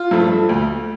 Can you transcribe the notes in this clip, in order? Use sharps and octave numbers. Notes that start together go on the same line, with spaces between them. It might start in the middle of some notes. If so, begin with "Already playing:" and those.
Already playing: F4
G2 F3 A3
D2